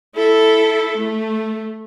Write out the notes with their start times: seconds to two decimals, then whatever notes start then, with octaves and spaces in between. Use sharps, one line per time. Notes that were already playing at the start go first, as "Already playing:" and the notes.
0.15 E4 A4
0.97 A3